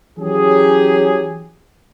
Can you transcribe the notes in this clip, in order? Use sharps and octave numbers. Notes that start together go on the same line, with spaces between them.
E3 F#3 C#4 G4 G#4